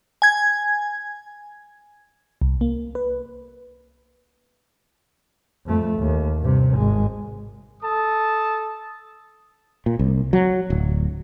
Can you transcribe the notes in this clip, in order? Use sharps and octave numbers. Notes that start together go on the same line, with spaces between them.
G#5 G#6
C2
A#3
B4
F2 A3
D#2
G2 C3
G#1 G#3
A4 A5 D#6
A#2
C2
F#3
D1